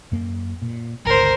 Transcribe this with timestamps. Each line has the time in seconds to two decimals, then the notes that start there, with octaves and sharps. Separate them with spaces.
0.12 F#2 A#3
0.62 A#2
1.05 G1 C#2 A#4 C5